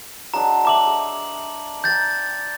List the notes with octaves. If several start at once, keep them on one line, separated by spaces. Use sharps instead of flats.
F#3 G#3 D4 A#5
A3 A#5 D6 E6 F#7
G#3
G5 A#5 G6 A6